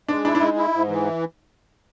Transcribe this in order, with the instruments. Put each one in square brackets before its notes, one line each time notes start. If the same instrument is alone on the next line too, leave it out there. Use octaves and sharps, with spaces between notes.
[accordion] G#3 [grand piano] D4
[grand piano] D4 [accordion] E4
[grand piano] D4
[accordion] G#3 [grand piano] D#4
[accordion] E4
G#2
E3